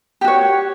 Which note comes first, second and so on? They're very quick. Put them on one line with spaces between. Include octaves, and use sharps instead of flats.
G4 F#4 C#5